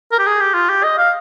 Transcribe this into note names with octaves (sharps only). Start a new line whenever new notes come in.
A#4
G4
G#4
G4
F4
G4
D#5
F5